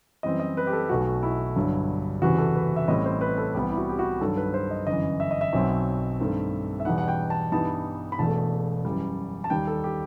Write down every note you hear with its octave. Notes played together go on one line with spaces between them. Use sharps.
F#2 E3 G3 C4 D#5
D#5
B4
G4
A4
B1 B2 A3 F#4
E4
G1 G2 F#3
F#1 E2 C3 E3 F#4
A4
B4
E5
A1 A2 G3 C4 D#5
C5
B4
A4
C2 C3 E3 G3 B3 G4
E4
F#4
G4
F#4
G2 D#3 F#3 A4
B4
C5
D#5
G1 F#2 E3 D#5
E5
D#5
E5
B1 B2 F#3 C4
G2 D#3 A3 C4
E5
E2 B2 G3 D#4 F#5
F#5
G5
A5
G2 E3 G3 B3 D#4 A5
B5
E1 E2 B2 A3 A5
F#2 E3 G3
A5
D#2 D#3 G3 G5
A4
G4